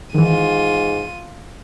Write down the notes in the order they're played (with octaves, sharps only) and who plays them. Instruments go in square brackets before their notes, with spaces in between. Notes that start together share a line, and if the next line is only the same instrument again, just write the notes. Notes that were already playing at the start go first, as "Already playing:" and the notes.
[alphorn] G#2 [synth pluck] D#3 E3 [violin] F4 D#7